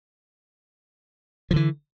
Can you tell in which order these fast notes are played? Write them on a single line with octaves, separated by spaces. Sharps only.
F3 D3 E3